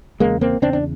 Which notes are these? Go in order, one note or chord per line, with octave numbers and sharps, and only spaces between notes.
E2 C#3 G#3 A#3
A#3 C4
E2 C#3 C4 D4
D4